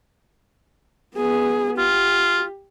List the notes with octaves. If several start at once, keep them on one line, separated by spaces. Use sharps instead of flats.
B3 G#4
F4 G4